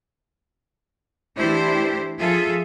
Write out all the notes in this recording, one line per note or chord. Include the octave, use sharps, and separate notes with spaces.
E3 A3 D4 E4 G4 C5
F3 F4 G#4 A4 E5